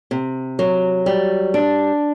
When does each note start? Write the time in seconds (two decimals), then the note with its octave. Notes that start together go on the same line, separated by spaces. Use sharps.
0.11 C3
0.59 F#3
1.06 G3
1.54 D4